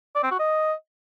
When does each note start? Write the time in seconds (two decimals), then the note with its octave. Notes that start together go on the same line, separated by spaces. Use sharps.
0.15 D5
0.23 C4
0.31 F#4
0.39 D#5